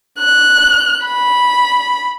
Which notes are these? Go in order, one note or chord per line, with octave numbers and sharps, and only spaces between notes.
F#6
B5